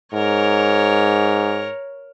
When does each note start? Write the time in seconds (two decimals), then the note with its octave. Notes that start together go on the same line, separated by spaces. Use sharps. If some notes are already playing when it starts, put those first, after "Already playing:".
0.14 G#2 A#4 C#5